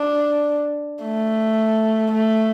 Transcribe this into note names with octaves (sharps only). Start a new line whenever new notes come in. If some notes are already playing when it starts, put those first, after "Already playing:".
Already playing: D4
A3
A3